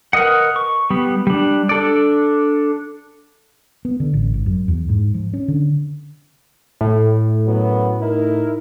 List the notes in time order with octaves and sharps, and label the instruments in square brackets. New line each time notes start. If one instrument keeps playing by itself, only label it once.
[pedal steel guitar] A#4 B4 D#5 F#5
C#6
G3 B3
G3 D4
D4 A4 D5
[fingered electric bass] B3
D3
A1
G#1
F#2
E2
G#2
F3
C#4
D3
[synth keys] A2
[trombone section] F#2 F#3 B3
D#4 E4 A#4